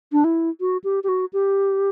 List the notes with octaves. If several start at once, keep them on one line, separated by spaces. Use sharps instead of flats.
D4
E4
F#4
G4
G4
F#4
G4